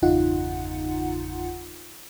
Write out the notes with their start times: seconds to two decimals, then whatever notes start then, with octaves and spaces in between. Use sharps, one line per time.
0.02 G1 E2 C#3 D#4 F4 F#5